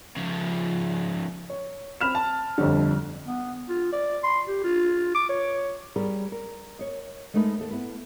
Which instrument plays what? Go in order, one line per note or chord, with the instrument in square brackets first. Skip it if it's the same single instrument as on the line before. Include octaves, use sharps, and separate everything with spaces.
[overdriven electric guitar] C#3 F3
[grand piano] C#5
C4 B5 F6 E7
A5
G1 F2 D3
[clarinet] B3
F4
D5
C6
G4
F4
D6
C#5
[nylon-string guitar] G3 G#4 A#4 B4 D5
A#4
C#5 D#5
G#3 A3 D#4 A#4 B4 E5
D#2 A4
B3 E4 A4 B4